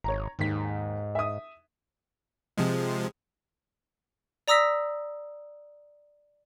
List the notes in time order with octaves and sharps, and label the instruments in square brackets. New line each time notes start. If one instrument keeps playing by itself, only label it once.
[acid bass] G#1 [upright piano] C#5 A#5
[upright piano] D#2 B6 [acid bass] G#2
[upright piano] E5 D#6
[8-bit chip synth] C3 F3 G#3
[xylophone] D5 A#5 D#6 E6 A#6 B6